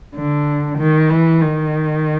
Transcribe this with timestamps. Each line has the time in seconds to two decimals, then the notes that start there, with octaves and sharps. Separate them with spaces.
0.15 D3
0.78 D#3
1.09 E3
1.41 D#3